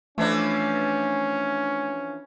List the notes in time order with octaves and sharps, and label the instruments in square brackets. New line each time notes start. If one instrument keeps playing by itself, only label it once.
[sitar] E3 F3 D4 [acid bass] A3 [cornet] C#4